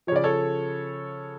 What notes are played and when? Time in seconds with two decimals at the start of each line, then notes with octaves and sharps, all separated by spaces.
0.07 F3 C#5
0.12 C#3 D5
0.24 A4 C#5